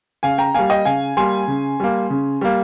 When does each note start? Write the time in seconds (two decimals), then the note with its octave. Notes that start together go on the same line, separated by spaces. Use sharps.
0.23 C#3 F5 G#5
0.38 G5 A#5
0.54 G3 A#3 F5 G#5
0.70 D#5 G5
0.85 C#3 F5 G#5
1.17 G3 A#3 G#5 C6
1.48 C#3
1.80 G3 A#3
2.10 C#3
2.41 G3 A#3